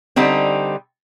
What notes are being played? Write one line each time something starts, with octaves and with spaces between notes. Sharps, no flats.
D3 G3 C4 D#4